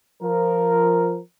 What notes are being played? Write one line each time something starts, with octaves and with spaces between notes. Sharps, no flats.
F3 A#4